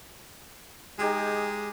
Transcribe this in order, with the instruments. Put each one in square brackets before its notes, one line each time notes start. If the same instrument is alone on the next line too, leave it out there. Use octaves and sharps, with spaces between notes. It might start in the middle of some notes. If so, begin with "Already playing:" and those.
[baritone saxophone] G#3 [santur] D#4 G4 G#4